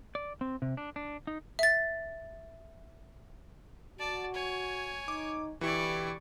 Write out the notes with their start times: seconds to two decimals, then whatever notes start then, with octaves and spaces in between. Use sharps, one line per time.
0.15 D5
0.41 C4
0.62 C3
0.77 D4
0.96 D4
1.27 D#4
1.59 E5 A6
3.99 F#4 D5 A5
4.34 C#5 G#5
5.08 D#4 D6
5.61 B2 D3 E3 E4 G4 D5 C#6